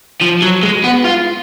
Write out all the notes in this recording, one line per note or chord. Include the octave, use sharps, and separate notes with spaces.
F3
F#3
G#3
B3
F4